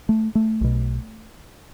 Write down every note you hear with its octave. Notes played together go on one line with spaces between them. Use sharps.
A3
A3
B1 B2